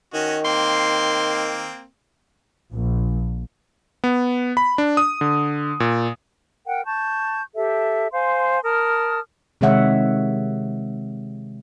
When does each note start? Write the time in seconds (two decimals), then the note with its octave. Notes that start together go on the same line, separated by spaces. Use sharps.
0.14 D#3 C#4 F#4 D#5
0.45 A#3 C4 C6
2.72 A#1
4.04 B3
4.57 B5
4.78 D4
4.97 D#6
5.21 D3
5.80 A#2
6.66 A#4 F#5 G5
6.85 A5 C#6 G6
7.55 G4 A4 E5
8.12 C5 F5 G#5 C6
8.64 A#4 A5 D#6 F6
9.61 C3 D#3 G#3 C#5 E5 F#5